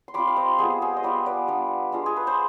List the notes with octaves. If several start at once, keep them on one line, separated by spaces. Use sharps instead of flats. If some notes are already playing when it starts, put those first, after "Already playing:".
C6
G3 C4 F4 B5 D6
F5
C5 D#5
G3 B3 F4 G#4 C5
G#4 C5
D#5
G3 B3 F4 B4 D5
B4 D5
G3 B3 D4
G#3 D4 F4
G#4
B4
C5